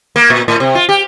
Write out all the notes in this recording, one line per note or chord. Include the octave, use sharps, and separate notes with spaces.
A#3
A#2
A2
C3
F4
G4